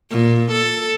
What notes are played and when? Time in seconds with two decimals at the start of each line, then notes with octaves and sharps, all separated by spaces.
0.11 A#2
0.52 A4